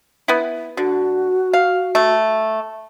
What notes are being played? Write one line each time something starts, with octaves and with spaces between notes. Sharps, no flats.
B3 E4
D3 F#4
F5
A3